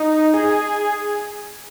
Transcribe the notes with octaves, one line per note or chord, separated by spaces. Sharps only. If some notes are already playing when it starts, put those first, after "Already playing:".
Already playing: D#4
G#4